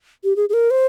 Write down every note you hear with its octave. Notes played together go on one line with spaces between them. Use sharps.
G4
G#4
G#4
A#4
C5